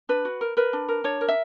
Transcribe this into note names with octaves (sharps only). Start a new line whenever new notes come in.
D4 B4
F#4
A#4
A#4 B4
D4
A#4
D4 C#5
A#4
E5